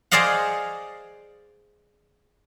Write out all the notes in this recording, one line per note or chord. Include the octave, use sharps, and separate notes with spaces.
G#4 C5 D5 D#5 F5 F#5